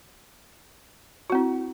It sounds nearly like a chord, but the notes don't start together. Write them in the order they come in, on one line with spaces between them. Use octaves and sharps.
F#4 C4 E4